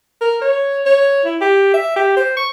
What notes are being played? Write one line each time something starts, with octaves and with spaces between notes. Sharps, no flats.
A#4
C#5
C#5
E4
G4
E5
G4
C5
C#6